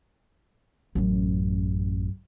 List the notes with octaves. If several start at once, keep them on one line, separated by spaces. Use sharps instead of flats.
A1 F#2